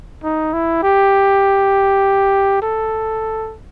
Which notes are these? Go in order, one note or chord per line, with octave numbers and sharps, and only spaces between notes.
D#4
E4
G4
A4